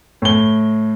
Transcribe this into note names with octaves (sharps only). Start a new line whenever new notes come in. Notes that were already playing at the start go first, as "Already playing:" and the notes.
A2 G7